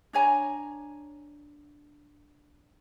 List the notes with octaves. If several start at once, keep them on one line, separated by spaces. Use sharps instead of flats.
D4 C#5 G#5 A#5